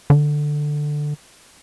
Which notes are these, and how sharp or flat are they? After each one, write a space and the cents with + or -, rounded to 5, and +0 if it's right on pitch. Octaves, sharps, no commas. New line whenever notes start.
D3 +10